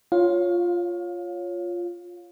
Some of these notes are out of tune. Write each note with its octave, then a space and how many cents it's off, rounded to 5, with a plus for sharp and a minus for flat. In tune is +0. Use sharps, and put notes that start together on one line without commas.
F4 +0 C#5 +0 F5 +30